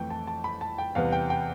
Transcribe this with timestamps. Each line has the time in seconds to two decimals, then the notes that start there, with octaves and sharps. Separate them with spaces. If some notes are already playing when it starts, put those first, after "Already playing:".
Already playing: F2 E3 A3 G5
0.10 A5
0.27 A5
0.44 B5
0.61 A5
0.78 G5
0.95 E2 C3 G3 B3 F5
1.12 G5
1.30 G5